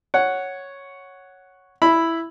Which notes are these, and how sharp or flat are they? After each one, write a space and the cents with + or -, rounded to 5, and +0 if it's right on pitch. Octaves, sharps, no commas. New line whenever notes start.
C#5 +0 F#5 +0
E4 +0 B5 +0